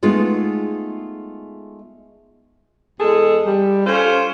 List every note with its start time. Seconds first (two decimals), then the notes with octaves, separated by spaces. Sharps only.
0.03 G#3 A3 B3 D#4 F4 G#4
3.00 E2 G#3 G#4 A4
3.46 G3
3.86 C#4 F4 A4 C5